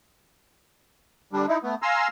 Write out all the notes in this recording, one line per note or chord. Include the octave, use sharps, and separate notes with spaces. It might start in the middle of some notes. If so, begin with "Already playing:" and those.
D3 G3 D4
D#4 E4
A3 B3
F5 G#5 A#5 C6 E6